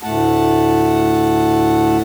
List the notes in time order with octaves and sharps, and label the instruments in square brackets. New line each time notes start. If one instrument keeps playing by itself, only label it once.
[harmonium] D2 A2 A3 F#5 A5